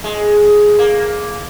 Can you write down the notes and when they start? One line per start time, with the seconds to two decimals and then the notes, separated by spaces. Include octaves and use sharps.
0.04 G#3
0.79 A#3